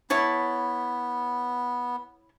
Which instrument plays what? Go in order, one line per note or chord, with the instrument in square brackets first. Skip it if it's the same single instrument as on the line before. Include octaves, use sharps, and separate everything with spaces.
[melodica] B3 [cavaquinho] E4 C#5 A5